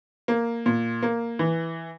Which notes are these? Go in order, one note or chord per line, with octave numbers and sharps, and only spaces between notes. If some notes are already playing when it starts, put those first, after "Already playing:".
A#3
A#2
A#3
E3